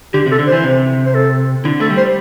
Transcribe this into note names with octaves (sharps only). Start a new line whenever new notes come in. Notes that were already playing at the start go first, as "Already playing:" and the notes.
D3 G4
C3
A4
D3
E3 C5
C3
C5
A4
D3 E4
A3 A4
G3
C5